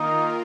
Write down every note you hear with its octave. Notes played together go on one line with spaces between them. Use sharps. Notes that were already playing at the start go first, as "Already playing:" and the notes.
Already playing: D#3 A#3 D#4 F4 A#4